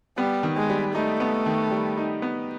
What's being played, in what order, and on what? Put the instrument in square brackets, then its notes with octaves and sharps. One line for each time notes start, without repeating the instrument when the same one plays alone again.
[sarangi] G3 [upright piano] B3
[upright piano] D#3
[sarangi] G#3
[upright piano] G3
[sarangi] A3 [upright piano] D#4
[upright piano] B3
D#3
G3
D#4
B3